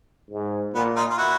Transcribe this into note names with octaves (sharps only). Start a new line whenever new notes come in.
G#2
A#2 B3
D#4 F4
F4
E4 F#4